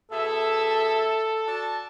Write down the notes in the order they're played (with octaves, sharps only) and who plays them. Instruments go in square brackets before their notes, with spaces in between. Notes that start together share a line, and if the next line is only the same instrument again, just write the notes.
[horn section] B2 G#4 E5 [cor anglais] A4
[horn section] F#4 D5 A5